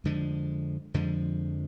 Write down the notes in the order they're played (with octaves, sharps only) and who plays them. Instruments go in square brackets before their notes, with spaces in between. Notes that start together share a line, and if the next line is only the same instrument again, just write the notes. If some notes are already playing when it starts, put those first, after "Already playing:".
[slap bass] F2 D3 F3 G#3
F2 D3 F3 G#3